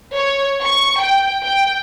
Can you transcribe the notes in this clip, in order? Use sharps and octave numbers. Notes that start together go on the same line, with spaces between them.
C#5
C#6
G5
G5